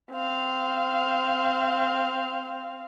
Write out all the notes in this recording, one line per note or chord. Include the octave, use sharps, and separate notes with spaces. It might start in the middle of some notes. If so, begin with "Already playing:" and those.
C4 F5